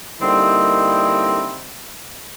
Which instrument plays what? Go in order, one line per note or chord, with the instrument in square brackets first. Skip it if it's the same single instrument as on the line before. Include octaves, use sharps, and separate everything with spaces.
[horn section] D3 G3 A#3 C4 D#4 E4